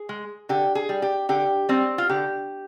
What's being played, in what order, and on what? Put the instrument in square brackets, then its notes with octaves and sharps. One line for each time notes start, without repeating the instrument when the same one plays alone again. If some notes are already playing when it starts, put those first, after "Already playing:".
Already playing: [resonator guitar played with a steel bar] G#4
G#3
D3 G4
G#4
G3
G4
D3 G4
G3 C4
F4
D3 G4